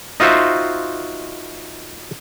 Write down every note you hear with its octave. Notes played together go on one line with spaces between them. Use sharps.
D#4 F4 F#4 C5 E5